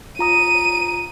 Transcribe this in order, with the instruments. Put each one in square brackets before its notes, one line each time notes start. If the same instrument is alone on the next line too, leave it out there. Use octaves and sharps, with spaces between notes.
[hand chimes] F4 A#5 D#6 [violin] D#7